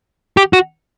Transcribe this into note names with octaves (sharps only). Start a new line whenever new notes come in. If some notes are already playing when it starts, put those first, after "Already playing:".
G4
F#4